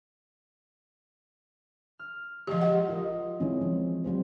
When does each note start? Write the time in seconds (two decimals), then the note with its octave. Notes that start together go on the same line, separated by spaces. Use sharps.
1.99 F6
2.47 F3 G#3 G4 D#5
2.61 D#5 F#5
2.88 F4 A#4 D#5
3.40 E3 G#3 C4 C#4
3.61 F3
4.04 F#3 G3 C4 C5